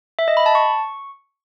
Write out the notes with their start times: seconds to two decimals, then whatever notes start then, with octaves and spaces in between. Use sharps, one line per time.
0.19 E5
0.28 D#5
0.37 B5
0.46 A5
0.55 C#6